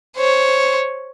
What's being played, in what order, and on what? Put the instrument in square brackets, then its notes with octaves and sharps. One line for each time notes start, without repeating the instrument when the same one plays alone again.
[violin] C5 C#5